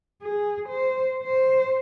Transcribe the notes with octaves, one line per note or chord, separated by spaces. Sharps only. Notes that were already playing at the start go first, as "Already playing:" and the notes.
G#4
C5
C5